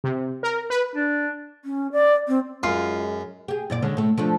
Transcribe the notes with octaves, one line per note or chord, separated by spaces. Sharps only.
C3
A#4
B4
D4
C#4
D5
C4
F#2 G#3 F4
G4 G#4
F#2 A#2 D5
D3 G#3 C#4
A2 A3
F3 A3 D4